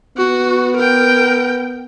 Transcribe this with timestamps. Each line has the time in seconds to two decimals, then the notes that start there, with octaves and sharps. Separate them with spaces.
0.17 B3 F#4
0.77 A#4 G5